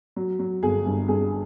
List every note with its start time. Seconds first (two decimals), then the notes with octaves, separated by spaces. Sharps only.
0.16 F#3
0.39 F#3
0.63 G1 G#4
0.86 G2
1.08 G2 G#4